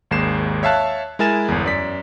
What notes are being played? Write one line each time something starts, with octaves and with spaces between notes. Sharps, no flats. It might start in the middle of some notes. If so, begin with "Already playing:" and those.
G#1 D#2 G#3 C7 E7
C#5 E5 F5 A5 F#6
G#3 E4 A#4 G#5 A6 E7
G1 E2
F#2 D5 B6